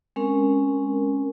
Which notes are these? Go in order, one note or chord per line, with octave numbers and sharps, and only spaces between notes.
G#3 C4 C#4 A#4